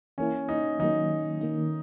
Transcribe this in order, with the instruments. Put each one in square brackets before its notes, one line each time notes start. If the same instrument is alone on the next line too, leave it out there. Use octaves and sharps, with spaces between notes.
[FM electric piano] E3 A#3 E4 [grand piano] C#4
[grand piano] D#4
[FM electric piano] D#3 F#3 A#3 [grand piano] D#4
[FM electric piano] D#3 A#3 D#4